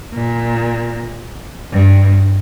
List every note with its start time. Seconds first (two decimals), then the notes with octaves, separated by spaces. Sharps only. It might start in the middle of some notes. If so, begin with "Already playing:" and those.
0.13 A#2
1.72 G2